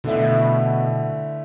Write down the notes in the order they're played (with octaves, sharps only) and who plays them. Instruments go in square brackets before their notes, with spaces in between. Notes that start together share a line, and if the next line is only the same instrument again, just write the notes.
[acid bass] B2 [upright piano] D3 A3 E4